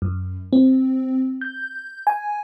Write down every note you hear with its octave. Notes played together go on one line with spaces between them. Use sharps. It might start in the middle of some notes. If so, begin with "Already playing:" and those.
F#2
C4
G6
G#5